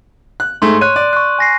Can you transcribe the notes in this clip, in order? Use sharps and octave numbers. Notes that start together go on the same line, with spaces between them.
F#6
G#2 A3 C6
C#5 F#6 D#7
D5
C#6 F#6
G#5 A#6 C7